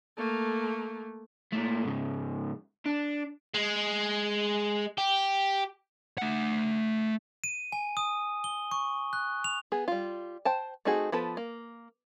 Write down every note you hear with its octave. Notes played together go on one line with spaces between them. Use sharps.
A3 A#3
A#2 A3
G#2 C#3
D4
G#3
G4
A3 F#5
D#7
G#5
D#6
G7
C#6
F#6
F7
B3 G#4
G3 F4
C5 G5 A5
A3 C4 D#4 F#4 G#4
F3 B3 A4 B4
A#3